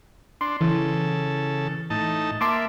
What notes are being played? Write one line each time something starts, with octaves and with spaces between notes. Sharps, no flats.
D4 C6
C#3 E3 A4
A2 D#4 A5
A#3 E5 A5 C6 D6